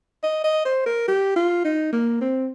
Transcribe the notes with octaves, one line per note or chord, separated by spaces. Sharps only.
D#5
D#5
C5
A#4
G4
F4
D#4
A#3
C4